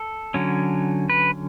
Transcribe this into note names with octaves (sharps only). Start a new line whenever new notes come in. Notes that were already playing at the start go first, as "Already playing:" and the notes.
Already playing: A4
D3 F#3 C#4
B4